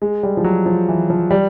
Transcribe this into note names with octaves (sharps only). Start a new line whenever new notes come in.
G#3
G3
F3
F#3
F3
E3
F3
G3